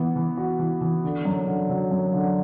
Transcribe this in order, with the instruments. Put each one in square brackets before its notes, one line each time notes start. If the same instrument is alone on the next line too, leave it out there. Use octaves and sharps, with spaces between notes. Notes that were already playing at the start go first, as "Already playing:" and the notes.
Already playing: [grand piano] E3 B3
E3
F#4
E3
E3
D3
F#2
D3
F#3
F#2
D3